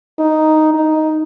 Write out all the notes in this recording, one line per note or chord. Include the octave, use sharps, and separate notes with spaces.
D#4
D#4